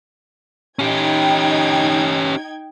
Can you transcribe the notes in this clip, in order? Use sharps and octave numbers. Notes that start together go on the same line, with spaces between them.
C#4 D#4 G4 G5 G#6